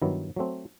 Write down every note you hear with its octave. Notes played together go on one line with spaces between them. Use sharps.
G2 D#3 F#3 B3 E4
F#3 A3 C4